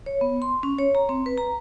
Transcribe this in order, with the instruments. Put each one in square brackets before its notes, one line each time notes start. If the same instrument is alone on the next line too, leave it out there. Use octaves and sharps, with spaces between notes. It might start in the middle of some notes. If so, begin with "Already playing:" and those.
[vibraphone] C#5
B3
C6
C#4
C#5
A#5
C4
B4
A#5